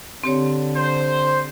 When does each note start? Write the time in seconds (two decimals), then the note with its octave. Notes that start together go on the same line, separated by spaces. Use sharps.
0.24 D3 C4 G4 C#5
0.76 C5